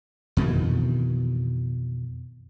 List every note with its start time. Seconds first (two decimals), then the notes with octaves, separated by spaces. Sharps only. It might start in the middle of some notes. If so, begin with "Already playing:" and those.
0.37 F2 B2 D#3 E3